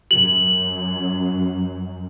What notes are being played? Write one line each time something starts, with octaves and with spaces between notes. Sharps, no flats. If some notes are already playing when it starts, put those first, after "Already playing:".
F#2 F#7